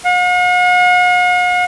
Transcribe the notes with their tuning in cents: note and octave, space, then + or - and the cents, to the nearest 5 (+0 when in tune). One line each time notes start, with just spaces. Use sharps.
F#5 -45